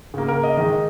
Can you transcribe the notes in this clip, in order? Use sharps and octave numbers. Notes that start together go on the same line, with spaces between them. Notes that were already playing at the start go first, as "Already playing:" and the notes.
C#3 A#3
A#4
D#5
D#3 G#3 D#5